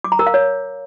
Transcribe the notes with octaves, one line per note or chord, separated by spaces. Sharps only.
D6
A#5
A#4
F5
C#5